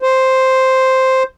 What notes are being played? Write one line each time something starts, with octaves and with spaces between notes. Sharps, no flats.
C5